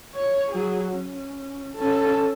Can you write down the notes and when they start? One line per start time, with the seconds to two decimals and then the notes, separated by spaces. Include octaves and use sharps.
0.15 C#5
0.52 F#3 G#4
0.91 C#4
1.76 C#4 A4